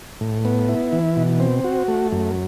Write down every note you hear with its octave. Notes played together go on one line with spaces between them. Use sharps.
A2
B3
E4
E3
B2
C4
F#4
A3
F#2